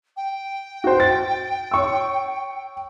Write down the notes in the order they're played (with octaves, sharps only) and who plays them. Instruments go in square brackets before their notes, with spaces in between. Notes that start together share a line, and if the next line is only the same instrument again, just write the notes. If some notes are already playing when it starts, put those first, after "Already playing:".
[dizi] G5
[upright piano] F#4 C5
A6
C#5 C#6 E6